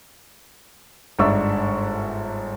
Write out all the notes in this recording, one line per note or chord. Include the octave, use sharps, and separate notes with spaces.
G1 G#2 D4 E5 C#6 E6